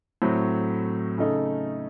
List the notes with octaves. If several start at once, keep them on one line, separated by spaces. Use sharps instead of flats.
A2 F#3 C4 F#4
C#3 A3 D#4 A4